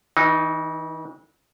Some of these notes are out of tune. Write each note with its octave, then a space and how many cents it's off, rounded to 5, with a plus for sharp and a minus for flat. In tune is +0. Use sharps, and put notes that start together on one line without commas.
E3 -35 D#4 +0